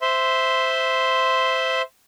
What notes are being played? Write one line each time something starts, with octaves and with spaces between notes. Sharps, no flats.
C5 E5 C6